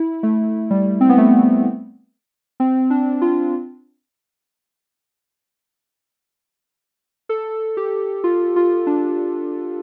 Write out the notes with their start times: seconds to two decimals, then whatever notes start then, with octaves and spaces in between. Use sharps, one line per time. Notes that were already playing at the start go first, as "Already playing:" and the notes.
Already playing: E4
0.23 A3
0.71 G3
1.01 C4
1.09 B3
1.18 A3
2.60 C4
2.90 D4
3.21 F4
7.29 A4
7.77 G4
8.24 F4
8.56 F4
8.87 D4